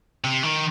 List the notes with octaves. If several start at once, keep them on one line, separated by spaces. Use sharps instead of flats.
C3
D#3